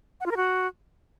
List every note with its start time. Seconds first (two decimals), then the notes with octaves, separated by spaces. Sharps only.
0.20 F#5
0.26 F4
0.31 A#4
0.37 F#4